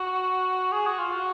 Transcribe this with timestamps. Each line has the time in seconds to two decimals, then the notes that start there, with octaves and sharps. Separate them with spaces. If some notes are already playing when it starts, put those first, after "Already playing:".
Already playing: F#4
0.72 G#4
0.87 F#4
0.99 F4
1.12 F#4